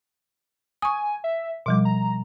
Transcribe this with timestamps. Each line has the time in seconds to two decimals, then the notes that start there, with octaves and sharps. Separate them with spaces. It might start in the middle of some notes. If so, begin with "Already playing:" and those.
0.82 G#5 C#6 D#6
1.24 E5
1.66 B2 F3 G3 D6
1.85 A#5